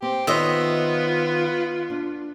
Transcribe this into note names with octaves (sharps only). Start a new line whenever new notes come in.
C4 G4
D#3 B3 F4 C5 C#5 D#5 E5
D4